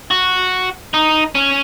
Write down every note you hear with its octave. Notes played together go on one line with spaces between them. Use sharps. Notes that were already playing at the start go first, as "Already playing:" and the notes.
F#4
D#4
C#4